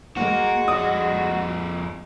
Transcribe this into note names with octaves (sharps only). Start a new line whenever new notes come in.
G#3 A#3 F#4
F2 D5 D#6